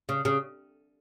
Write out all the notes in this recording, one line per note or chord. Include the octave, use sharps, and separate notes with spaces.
C#3
C#3